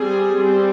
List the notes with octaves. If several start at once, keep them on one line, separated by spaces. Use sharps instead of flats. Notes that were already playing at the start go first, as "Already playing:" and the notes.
Already playing: G3 C4 G#4
G3 C4